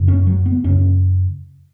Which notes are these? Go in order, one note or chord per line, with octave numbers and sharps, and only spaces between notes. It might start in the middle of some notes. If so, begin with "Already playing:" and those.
Already playing: F#2 C#3
C#4
F#3
B3
F#2 C#3 C#4